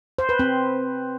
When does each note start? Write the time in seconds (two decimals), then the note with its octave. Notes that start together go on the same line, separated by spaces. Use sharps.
0.19 C5
0.29 B4
0.39 C4